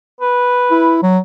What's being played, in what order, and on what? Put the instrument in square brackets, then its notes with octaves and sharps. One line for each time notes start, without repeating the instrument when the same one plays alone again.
[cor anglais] B4
[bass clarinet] E4
F#3